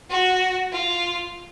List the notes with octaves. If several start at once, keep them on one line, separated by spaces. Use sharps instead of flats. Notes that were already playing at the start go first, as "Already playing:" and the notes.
F#4
F4